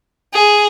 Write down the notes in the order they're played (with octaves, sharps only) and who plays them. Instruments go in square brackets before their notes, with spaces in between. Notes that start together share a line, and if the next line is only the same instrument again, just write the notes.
[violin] G#4